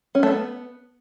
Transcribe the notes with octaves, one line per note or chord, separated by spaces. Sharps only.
C#4
A3
B3